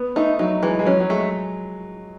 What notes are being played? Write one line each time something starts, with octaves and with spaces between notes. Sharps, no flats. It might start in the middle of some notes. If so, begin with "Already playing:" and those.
Already playing: B3
A3 D#4
F#3 D#4
E3 G#3
G#3
F#3 C#4
F#3
G#3 A3